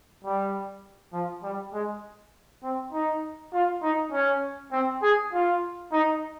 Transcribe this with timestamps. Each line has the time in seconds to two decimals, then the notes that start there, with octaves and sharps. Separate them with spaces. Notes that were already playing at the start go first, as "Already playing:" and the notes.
0.24 G3
1.13 F3
1.43 G3
1.74 G#3
2.63 C4
2.93 D#4
3.53 F4
3.82 D#4
4.12 C#4
4.72 C4
5.03 G#4
5.33 F4
5.92 D#4